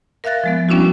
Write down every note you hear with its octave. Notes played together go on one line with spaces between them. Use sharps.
A#4 E5 F5 F#6 A6 A#6
F3 G#3 B3
G3 B3 C#4 D4 E4 F#4